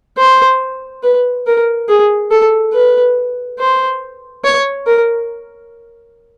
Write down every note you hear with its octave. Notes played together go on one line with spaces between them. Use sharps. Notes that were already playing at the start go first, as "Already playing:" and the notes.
C5
B4
A#4
G#4
A4
B4
C5
C#5
A#4